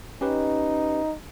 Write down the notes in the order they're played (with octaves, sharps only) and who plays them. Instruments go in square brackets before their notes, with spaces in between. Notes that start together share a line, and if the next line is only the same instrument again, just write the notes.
[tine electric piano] C#4 G4 B4 [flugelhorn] D#4